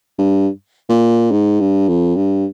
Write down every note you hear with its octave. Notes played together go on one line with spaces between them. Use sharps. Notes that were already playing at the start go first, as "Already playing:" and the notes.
G2
A#2
G#2
G2
F2
G2